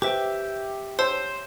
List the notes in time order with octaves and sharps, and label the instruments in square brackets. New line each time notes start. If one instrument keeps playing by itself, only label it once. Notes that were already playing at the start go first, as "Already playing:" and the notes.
[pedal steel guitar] G4 E5 G5 [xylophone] B4 C5
[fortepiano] C5 [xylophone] C#5 A5 E6